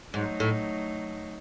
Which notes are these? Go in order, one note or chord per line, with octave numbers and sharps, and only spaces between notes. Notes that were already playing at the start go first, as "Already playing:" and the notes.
G#2 F#3 A3 D#4
A2